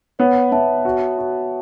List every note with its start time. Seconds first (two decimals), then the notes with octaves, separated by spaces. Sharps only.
0.19 B3 C#5 F#5
0.52 B3 E5 A5
0.85 F#4
1.18 F#4